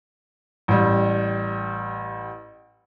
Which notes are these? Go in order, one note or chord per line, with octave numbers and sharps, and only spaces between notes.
A1 G3